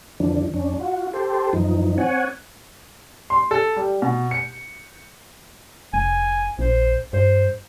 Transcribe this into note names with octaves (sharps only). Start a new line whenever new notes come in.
F2 D3 E3 F3 D4
F2 C#4 D4
F4 F#4
G4 A4 C5
F#2 E3 F3 D#4
C4 C#5 F#5 G#5
C6
A4
G3
B2
C#7
F1 G#5
A#1 C5
G2 C5